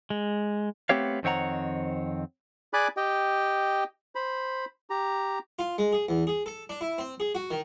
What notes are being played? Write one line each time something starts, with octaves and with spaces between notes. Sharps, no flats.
G#3
A3 B3 C4 G4 C#5 F5
F2 D#3 C4 C#5 F#5 A#5
G#4 D5 G#5 B5 D6 F#6
G4 D#5 G5
C5 B5
G4 A#5
F4
G#3
G#4
E2
G#4
A4
D4
E4
C4
G#4
F#4
D#3